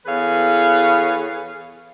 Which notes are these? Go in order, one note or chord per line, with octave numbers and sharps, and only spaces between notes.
E2 G#4 A4 B4 C#5 F5